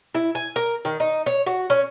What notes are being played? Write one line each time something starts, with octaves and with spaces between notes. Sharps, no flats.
E4
G#5
A#4
D#3
D#4
C#5
F#4
C#4